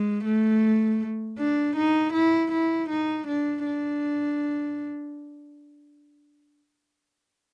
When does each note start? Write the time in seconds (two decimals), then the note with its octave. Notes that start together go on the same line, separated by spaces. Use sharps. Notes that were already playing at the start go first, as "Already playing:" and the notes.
Already playing: G#3
0.25 A3
1.38 D4
1.76 D#4
2.13 E4
2.52 E4
2.89 D#4
3.28 D4
3.66 D4